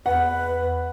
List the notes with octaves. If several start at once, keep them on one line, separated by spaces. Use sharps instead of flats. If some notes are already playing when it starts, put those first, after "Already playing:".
E2 B4 F#5